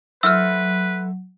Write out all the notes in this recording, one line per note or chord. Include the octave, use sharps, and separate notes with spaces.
F#3 A3 E4 B4 C5 E6 F6